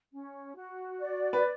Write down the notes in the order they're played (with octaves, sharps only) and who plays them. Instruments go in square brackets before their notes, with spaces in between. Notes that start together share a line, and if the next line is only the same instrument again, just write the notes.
[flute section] C#4
F#4
D5
[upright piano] B4